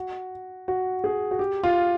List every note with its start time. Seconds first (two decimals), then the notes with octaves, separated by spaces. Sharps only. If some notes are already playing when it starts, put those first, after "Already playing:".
Already playing: F#4
0.68 F#4
1.04 G#4
1.31 F#4
1.39 G4
1.63 F4